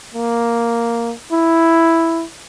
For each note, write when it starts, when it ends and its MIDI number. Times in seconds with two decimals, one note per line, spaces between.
0.15 1.13 58
1.32 2.24 64